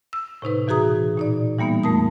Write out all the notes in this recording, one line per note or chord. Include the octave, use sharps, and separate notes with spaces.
E6
A2 C3 D#4 B4
B2 E3 F#4 G#4 A#5 D#6
A#2 D#4 D5
E3 G3 A#3 B3 D#4
F2 A3 A#4 A5 D#6